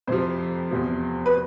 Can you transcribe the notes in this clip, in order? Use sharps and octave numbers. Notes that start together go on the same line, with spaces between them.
F2 C3 F3 C5
E2 C3 F3
B4